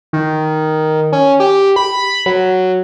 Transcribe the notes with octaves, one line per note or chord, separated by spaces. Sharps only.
D#3
C#4
G4
B5
F#3